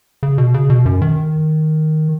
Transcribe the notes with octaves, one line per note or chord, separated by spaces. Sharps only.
C#3
B2
C#3
B2
F#2
D#3